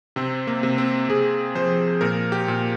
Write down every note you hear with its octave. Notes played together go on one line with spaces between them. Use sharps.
C3 C4
A#3
C3
C4
C3 G#4
F3 C5
A#2 A#4
G4
A#2